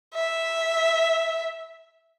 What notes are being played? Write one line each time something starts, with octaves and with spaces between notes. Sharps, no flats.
E5